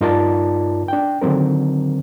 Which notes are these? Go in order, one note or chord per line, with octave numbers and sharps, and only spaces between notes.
G2 D#4 F4 A#4 D5 A5
D4 G5
D3 D#3 F#3 C4 A#4